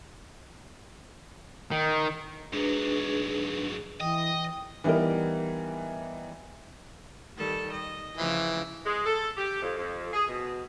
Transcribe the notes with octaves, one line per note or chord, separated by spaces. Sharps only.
D#3
G#2 F#3 D4 G#4 B4
E3 D#5 G5 D#6
E3 G3 B3 D#4 A#4
D#3 G3 A4
D#5
C#3 E3 F3
G#3
A4
G4
F2
F2
G#4
B2